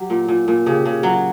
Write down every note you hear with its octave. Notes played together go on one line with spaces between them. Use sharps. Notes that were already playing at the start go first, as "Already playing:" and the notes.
Already playing: F#3 G4
A#2
A#2
A#2
C#3 G4
C#3
F#3